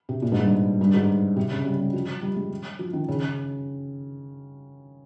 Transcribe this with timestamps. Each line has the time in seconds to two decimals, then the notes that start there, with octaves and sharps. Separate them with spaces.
0.09 C3
0.22 A#2
0.32 G#2
0.42 G2
0.81 G2
0.94 G#2
1.36 C3
1.51 C#3
1.65 G3
1.79 G3
1.93 F3
2.08 F3
2.22 G3
2.36 G#3
2.79 F3
2.93 D#3
3.08 C#3